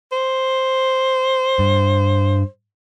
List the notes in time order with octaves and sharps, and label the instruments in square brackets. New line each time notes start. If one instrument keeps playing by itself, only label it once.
[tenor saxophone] C5
[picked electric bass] G2